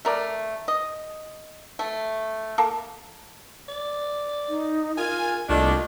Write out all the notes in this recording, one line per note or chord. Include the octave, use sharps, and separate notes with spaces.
A3 A#4 D5
D#5
A3
A#3 A4
D5
D#4
F4 A#4 G#5
C2 A3 A#3 D4 F4 D#5